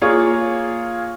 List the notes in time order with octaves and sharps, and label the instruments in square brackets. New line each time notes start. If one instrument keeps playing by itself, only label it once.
[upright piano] A#3 F4 G#4 C#5